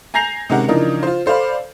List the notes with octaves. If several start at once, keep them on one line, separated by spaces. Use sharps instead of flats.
G#5 A#5 G6 A#6 C7 F7
C3 D#3 G#3 C#4 A#4 F#5
C#3 E3 F3 D4 D#4 A#4
F4 C5
A4 C5 D5 F5 B5